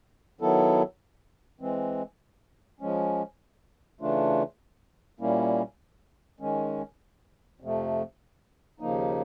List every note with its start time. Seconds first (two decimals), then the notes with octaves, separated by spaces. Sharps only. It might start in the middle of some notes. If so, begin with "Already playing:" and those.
0.41 D#3 F#3 B3 E4 A4
1.60 E3 G#3 C4
2.80 F3 G#3 C#4
4.01 C#3 E3 A3 D4 F4
5.20 A#2 G3 A#3 C#4 E4
6.40 D#3 G#3 C#4
7.60 F2 C3 F3 A3
8.80 D#2 C#3 F3 A#3 D#4